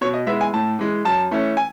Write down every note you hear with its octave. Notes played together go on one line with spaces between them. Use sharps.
B2 C#5
D#5
G#3 B3 E4 E5
G#5
A2 A5
E3 G#3
F#2 A5
E3 A3 C#4
G#5